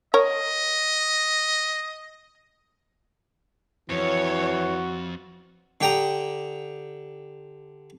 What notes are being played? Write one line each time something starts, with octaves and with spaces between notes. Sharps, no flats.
A#4 C#5 D#5
F2 E3 F#4 C#5
D3 G4 G5 A#5 D#6